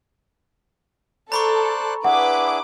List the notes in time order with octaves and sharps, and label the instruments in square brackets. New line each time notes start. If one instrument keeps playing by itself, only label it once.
[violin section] A4 [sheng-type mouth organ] C5 D5 F#6 [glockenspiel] A#5 B5 C#6
[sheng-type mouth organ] D4 E4 G#4 [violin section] B4 D6 [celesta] F#5